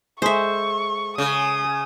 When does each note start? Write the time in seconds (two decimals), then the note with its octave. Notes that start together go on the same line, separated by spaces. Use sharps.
0.22 G#3 A4 C5 E5 C#6
1.18 C#3 D#6